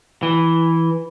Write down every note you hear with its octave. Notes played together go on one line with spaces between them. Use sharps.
E3